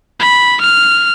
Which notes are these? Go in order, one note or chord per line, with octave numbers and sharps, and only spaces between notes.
B5
F6